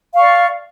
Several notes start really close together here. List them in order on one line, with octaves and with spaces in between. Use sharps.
F5 C#6 D5